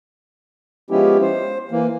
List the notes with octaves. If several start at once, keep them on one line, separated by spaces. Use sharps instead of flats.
F3 G#3 B3 C#4 E4 G4
C5
E3 A#3